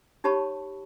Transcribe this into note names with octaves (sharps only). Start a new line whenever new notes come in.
D#4 G4 C#5 A5 B5 C#6